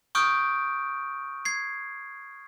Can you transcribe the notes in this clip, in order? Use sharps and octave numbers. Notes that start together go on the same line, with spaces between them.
C#6 D#6 F6 G6 D7
G#6 C7